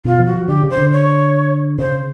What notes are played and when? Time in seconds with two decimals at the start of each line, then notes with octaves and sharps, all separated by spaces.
0.05 B2 F4
0.19 F3
0.26 F#4
0.34 F3
0.48 D3 G4
0.63 C#3
0.70 C5
0.77 D3
0.92 C#5
1.79 C#3 C5